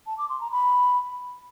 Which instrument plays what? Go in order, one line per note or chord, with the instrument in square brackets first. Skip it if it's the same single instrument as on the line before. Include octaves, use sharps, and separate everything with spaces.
[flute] A5
D6
C6
A#5
B5